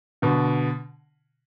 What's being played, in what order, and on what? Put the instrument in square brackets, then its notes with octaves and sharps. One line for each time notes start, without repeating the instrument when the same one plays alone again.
[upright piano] B2 D3